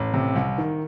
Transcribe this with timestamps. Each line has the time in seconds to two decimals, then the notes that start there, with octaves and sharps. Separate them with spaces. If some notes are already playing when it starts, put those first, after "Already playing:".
Already playing: A1
0.14 C3
0.36 C2
0.58 D#3